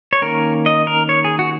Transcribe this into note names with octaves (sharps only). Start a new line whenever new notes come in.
C#5
D#3 A#3 C#4 A#4
D#5
A#4
C#5
G#4
F#4